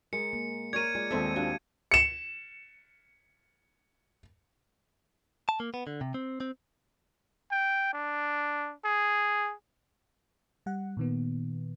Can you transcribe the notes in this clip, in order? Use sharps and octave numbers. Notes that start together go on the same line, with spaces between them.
G#3 A#4 C#7
A#3
A#4 C#5 D5 G#6 D#7
G#3 F4 D5
D#1 G#3 A#3 C4 A4 E5
D4 F#4 G4 F5
C#7 E7
A5
A#3
B3
D3
C3
C4
C4
G5
D4
G#4
G3 F#5
A#2 D#3 B3